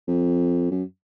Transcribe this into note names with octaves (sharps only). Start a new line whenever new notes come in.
F2
F#2